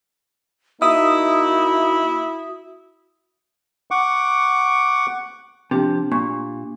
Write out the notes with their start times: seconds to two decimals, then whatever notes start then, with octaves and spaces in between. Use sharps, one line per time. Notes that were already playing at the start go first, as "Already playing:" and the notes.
0.82 A#3 D#4 E4 F#4 E5 D#6
3.91 F#5 C#6 D6
5.71 C3 F3 D4 G4
6.12 A#2 C#6